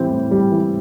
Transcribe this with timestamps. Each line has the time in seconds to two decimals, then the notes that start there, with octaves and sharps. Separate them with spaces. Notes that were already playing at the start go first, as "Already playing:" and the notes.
Already playing: A2 E3 G3 C4
0.11 A2
0.31 G3
0.52 E3